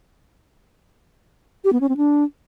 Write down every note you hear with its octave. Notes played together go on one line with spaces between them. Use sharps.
G4
B3
C#4
C4
D4